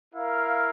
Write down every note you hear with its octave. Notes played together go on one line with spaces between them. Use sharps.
E4 A#4 F5